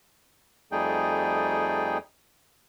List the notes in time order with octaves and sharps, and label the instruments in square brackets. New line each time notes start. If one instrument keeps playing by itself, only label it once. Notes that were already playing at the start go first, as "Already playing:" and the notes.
[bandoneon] F2 G3 A3 D#4 G#4 G5